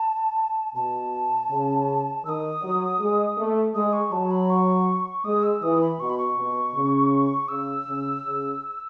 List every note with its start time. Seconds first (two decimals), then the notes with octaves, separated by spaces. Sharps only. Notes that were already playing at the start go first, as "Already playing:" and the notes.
Already playing: A5
0.75 B2 A5
1.50 C#3
2.25 D#3 E6
2.29 D#6
2.62 F#3
2.99 G#3
3.37 A3
3.75 G#3 D#6
3.93 C#6
4.12 F#3 A5
4.31 B5
4.50 C#6
5.24 G#3 D#6
5.43 E6
5.62 E3 D#6
5.81 B5
5.99 B2 C#6
6.09 B5
6.18 C#6
6.36 B2
6.74 C#3
7.48 C#3 E6
7.86 C#3
8.24 C#3